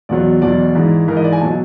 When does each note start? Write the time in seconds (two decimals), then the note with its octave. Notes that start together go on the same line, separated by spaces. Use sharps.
0.09 E2 B2 F#3 D5
0.42 E2 B2 F#3 D5
0.75 G#2 E3
1.08 G#2 E3 A#4
1.17 D#5
1.24 D5
1.32 G#5
1.41 B2 F#3 A5